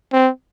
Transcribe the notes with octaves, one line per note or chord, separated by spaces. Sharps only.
C4